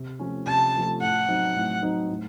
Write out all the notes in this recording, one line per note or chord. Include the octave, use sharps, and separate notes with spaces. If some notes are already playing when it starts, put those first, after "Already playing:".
Already playing: C3
F3 A3 C#4
C3 A5
F3 A3 C#4
A2 F#5
F#3 C4 D#4
A2
F#3 C4 D#4
A2